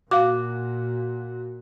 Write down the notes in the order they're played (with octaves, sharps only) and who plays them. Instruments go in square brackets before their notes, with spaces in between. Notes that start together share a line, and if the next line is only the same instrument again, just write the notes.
[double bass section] A#2 [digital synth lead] F#4 [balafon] F5 D6